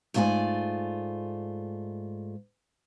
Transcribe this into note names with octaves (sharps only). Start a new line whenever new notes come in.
G#2 A3 F4 C5 D5 G#5